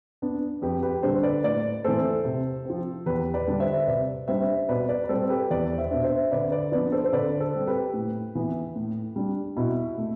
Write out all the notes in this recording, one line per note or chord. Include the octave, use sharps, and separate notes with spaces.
B3 D4
F2 G4 B4
G4 B4
D3 G3 D4 A4 C5
B4 D5
A2 B4 D5
E3 A3 A4 C5
C3
F3 C4
E2 G4 B4
B4 D5
D3 G3 D4
C5 E5
C3 B4 D5
G3 D4 C5 E5
B2 B4 D5
B4 D5
B4
G3 C4 A4 C5
G4 B4
E2 B4 D5
C5 E5
B2 B3 D4
C5 E5
D3 B4 D5
B4 D5
F3 B3 D4 B4 D5
A4 C5
C5
D3 B4 D5
A4 C5
G3 C4
G4 B4
A2
E3 B3
A2
G3 D4
B2 E4
A3